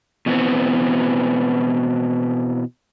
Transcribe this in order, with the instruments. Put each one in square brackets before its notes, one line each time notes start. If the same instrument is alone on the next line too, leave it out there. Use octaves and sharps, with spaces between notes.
[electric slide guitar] B2 E3 B3 C4